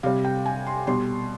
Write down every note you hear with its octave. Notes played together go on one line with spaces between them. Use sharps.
C3 G3 F5
G5
G#5
C6
B2 G3 C6